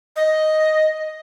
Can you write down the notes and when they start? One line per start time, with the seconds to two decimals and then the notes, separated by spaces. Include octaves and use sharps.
0.16 D#5